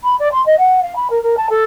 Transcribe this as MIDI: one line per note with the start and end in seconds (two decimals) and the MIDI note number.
0.03 0.15 83
0.19 0.28 74
0.31 0.43 84
0.46 0.57 75
0.58 0.80 78
0.82 0.95 77
0.95 1.07 83
1.10 1.21 70
1.22 1.35 70
1.37 1.46 81
1.49 1.64 69